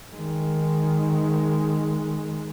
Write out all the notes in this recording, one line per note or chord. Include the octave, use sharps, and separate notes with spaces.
D#3 G#3